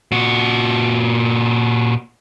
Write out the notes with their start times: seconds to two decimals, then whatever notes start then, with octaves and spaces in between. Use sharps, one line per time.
0.12 A#2 F#4